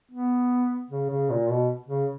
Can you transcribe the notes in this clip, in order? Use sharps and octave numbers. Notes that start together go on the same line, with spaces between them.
B3
C#3
C#3
A#2
B2
C#3